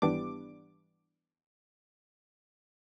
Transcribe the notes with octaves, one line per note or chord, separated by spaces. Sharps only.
G#1 E3 G3 B3 D4 D6